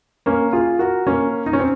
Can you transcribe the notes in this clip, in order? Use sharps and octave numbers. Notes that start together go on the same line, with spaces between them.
A#3 C#4
F4 G#4
F#4 A#4
A#3 C#4
D#4
C#4
C4